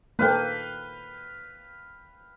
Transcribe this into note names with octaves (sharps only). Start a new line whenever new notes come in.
A#3 A4 B4 F5 G5